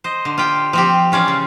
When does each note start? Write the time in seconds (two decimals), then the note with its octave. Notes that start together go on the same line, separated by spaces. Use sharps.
0.04 C5 D#5
0.25 D3
0.38 F4 G4 G5
0.73 F3 C4 G4
1.12 E3 C#4 F4 D5
1.28 C#3